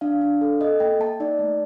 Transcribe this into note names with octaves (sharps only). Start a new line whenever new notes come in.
D4 F5
D4
A4
A4 D#5
A#3 G5
A#3 A5
D#4 D5
A3